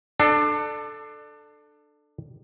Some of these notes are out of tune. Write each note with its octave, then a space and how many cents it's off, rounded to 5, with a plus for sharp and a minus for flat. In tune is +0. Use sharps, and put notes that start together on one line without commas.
D4 +20 A4 +0